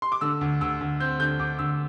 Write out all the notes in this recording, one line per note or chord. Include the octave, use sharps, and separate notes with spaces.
C6
D6
D3 E6
D2
D2 E6
D2
C4 G6
D3 G6
D2 D6
D2 E6